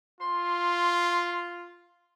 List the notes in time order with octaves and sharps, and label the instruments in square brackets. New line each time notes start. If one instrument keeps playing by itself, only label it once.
[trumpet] F4 [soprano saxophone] C6